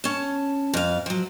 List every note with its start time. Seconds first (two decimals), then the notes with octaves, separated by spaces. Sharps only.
0.04 C#4 A5
0.74 F2 F5
1.06 F3 F#3